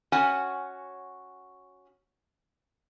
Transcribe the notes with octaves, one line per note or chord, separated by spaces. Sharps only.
C#4 F#4 C#5 F#5 G#5